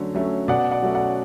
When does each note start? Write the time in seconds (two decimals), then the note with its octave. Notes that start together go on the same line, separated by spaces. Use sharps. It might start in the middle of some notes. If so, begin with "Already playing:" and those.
Already playing: D3 F#3 A3 C#4
0.15 F#3 A3 C#4
0.48 B2 D5 F#5
0.71 D5 F#5
0.83 F#3 A3 C#4
0.95 D5 F#5